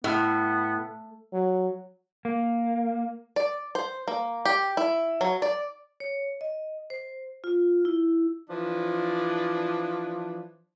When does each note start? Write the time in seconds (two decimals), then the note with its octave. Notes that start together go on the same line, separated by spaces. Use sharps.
0.04 A2 B3
1.33 F#3
2.25 A#3
3.36 D5
3.75 C5
4.08 A#3
4.45 G4
4.77 E4
5.21 F#3
5.42 D5
6.00 C#5
6.41 D#5
6.90 C5
7.44 F4
7.85 E4
8.50 E3 F3 D4